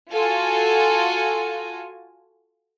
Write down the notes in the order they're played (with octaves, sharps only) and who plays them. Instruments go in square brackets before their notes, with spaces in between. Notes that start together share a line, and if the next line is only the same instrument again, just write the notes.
[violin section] F4 F#4 A4 G#5